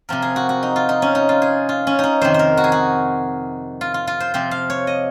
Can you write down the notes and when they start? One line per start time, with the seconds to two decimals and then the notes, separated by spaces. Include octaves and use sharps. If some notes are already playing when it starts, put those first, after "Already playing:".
0.09 C3 F3 C4 A#4
0.22 G#4
0.36 F#4
0.49 F#4
0.63 D#4
0.76 F4
0.89 D#4
1.02 C#4
1.15 D#4
1.29 F4
1.42 G#4
1.69 F4
1.87 C#4
1.99 C#4 D#4
2.21 F2 C3 D#3 C5
2.34 A#4 C5
2.57 F#4
2.64 G#4
2.72 F#4
3.81 F4
3.94 F4
4.07 F4
4.20 C5
4.34 C3 F3 C4 C5
4.51 F5
4.70 C#5
4.87 D#5